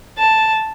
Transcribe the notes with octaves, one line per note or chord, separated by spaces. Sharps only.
A5